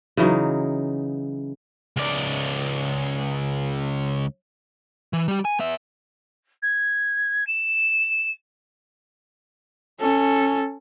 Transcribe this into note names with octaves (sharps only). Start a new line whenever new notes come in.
C#3 E3 F#3 D#4
C#2 D5
E3
G3 G4
G#5
B3 E5
G#6
E7
C#4 A4